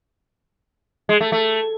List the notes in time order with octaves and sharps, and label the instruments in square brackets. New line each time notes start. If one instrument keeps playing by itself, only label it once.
[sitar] G#3
A3
A3